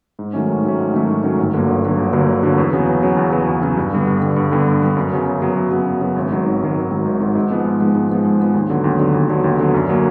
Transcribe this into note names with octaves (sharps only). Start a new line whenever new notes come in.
G#2
D#3 F#3 A3 C#4
G#2
D#3 F#3 A3 C#4
G#2
D#3 F#3 A3 C#4
G#2
D#3 F#3 A3 C#4
G1
G2 D3 F#3 A#3
G1
G2 D3 F#3 A#3
G1
G2 D3 F#3 A#3
G1
G2 D3 F#3 A#3
E2
C#3 F#3 B3
E2
C#3 F#3 B3
E2
C#3 F#3 B3
E2
C#3 F#3 B3
G2
D3 G3 B3
G2
D3 G3 B3
G2
D3 G3 B3
G2
D3 G3 B3
F#2
C#3 F#3 B3
F#2
C#3 F#3 B3
F#2
C#3 F#3 B3
F#2
C#3 F#3 B3
G#1
G#2 D#3 F#3
G#1
G#2 D#3 F#3
G#1
G#2 D#3 F#3
G#1
G#2 D#3 F#3
G#2
F3 G#3 B3
G#2
F3 G#3 B3
G#2
F3 G#3 B3
G#2
F3 G#3 B3
D#2
D3 F#3 B3
D#2
D3 F#3 B3
D#2
D3 F#3 B3
D#2
D3 F#3 B3
F#2
D3 F#3 A#3